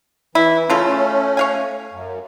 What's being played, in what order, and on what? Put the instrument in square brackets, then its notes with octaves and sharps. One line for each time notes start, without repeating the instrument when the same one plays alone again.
[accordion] E3 [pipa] E4
[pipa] C#3 F4 A4 [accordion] A3 C#4
[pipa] C#5 F5 G#5
[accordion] F#2